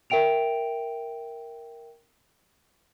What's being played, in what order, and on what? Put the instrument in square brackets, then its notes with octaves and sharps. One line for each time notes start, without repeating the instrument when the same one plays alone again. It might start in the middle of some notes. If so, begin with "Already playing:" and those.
[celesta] A#4 E5 G5 D7 F7